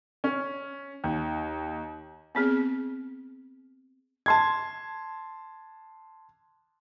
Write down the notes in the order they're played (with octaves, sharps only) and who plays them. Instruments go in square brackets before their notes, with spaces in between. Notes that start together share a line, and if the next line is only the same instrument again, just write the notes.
[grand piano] C#4
D#2
[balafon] B3 C4 G#4
[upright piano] A5 C6 G#6